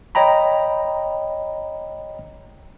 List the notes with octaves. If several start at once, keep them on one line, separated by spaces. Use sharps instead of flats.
C#5 D#5 G5 A#5 B5